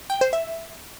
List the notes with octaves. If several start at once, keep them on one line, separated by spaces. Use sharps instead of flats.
G5
C5
E5